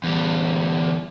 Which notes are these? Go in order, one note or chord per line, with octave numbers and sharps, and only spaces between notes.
E2 G3